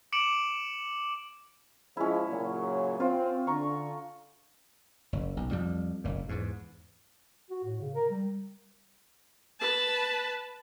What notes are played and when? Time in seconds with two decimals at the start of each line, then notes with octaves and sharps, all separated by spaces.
0.12 D6 C#7 D7 E7 F#7
1.97 F3 G#3 C#4 E4
2.29 A#2 C#3 F#3
3.00 C4 F4
3.47 D3 A#5 C#6
5.13 F#1
5.37 B1
5.51 F2 G3
6.04 F#1 A#2
6.29 E2 G#2
7.50 F#4
7.65 A2
7.81 C#3
7.95 A#4
8.11 G3
9.60 B4 A5